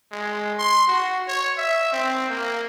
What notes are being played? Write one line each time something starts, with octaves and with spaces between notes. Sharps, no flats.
G#3
C6
F#4
C#5
E5
C4
A#3